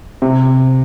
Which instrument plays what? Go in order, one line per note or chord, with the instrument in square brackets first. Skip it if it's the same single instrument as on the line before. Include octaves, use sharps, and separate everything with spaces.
[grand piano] C3